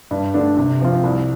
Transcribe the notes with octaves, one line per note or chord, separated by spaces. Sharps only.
G2
D3 A3 D4
C3
F3 C4 F4
C2